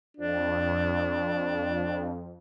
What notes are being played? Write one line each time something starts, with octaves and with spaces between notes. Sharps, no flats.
F2 D4